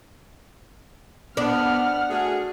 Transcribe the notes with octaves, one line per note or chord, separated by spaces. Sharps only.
B3 D4 F#5 F6
A3 F#4 G#4